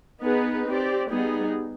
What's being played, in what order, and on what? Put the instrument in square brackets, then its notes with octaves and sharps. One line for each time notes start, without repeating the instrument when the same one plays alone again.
[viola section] B3 D#4 G#4 B4
C4 G4 D5
G3 B3 D#4 G#4